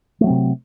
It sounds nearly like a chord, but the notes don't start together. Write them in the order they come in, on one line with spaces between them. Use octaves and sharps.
A3 F#3 C4 C3